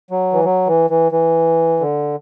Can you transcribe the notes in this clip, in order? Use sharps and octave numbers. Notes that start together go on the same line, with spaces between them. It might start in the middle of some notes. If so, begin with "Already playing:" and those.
F#3
E3
F#3
E3
E3
E3
D3